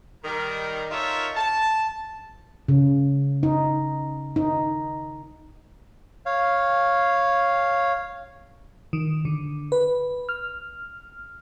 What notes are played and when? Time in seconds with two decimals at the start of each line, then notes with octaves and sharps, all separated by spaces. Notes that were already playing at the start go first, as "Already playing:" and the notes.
0.23 D#3 G3 A#4
0.90 D#4 F4 A4 A#4 C#5 E5
1.35 A5
2.68 C#3
3.43 D#4
4.36 D#4
6.26 C#5 F5
8.93 D#3
9.25 D3
9.72 B4
10.29 F6